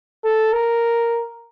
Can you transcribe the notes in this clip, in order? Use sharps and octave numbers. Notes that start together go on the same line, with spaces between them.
A4
A#4